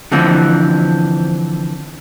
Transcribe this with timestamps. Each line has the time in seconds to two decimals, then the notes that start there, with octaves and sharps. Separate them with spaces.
0.12 D3 E3 F3 C4